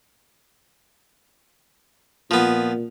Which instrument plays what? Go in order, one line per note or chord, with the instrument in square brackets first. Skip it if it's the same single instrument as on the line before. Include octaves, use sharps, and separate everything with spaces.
[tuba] A#2 [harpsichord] F3 B3